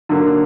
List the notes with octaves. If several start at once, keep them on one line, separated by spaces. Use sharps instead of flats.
D3 F#3 A#3